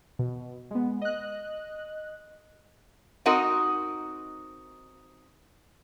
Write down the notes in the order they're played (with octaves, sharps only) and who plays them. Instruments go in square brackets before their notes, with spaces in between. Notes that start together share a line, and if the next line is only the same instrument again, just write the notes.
[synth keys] B2
G#3 B3
D#5 F#6
[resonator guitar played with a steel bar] C4 D#4 F#4 A#4 D#5